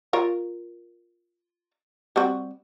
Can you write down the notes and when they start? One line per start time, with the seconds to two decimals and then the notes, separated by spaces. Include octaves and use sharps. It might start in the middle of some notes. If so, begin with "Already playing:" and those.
0.13 F4 A#4 C#5
2.16 G3 C4 F#4